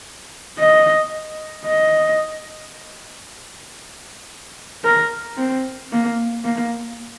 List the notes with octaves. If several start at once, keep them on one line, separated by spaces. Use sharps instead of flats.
D#5
D#5
A#4
C4
A#3
A#3